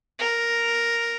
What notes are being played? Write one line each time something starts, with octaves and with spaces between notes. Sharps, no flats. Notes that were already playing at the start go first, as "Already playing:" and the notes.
A#4